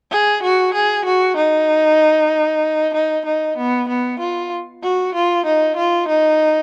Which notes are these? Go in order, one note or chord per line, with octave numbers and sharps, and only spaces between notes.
G#4
F#4
G#4
F#4
D#4
D#4
D#4
B3
B3
F4
F#4
F4
D#4
F4
D#4